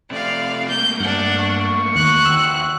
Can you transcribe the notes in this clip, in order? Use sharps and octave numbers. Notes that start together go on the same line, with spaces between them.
C3 A3 D5 F5
A3 A#3 G6
G2 D4 F#5
C#6
D#2 F#6 C#7
D#3 F#4 E6